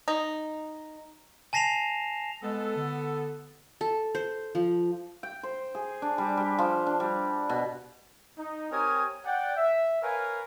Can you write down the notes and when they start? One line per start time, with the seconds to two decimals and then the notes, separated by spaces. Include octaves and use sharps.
0.08 D#4
1.53 G#5 A5 A#6 C7 E7 F7
2.43 G#3 B3 A4
2.76 D3
3.81 A4
4.15 C5
4.55 F3
5.23 G5
5.43 C5
5.75 G#4
6.02 D4
6.18 G3
6.37 G3
6.59 F3
6.86 D4
7.00 G3
7.49 B2
8.38 D#4
8.71 C4 G4 A#4 C#5 G#5 D#6
9.25 D5 F#5 G5
9.56 E5
10.02 A#4 B4 C#5 F5 G#5